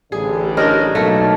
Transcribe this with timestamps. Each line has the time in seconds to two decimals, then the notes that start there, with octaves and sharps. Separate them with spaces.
0.12 A1 D3 G3 G#4
0.57 D4 D#4 A#4 C#5 D#5
0.95 B1 A3 A#3 F#4 A5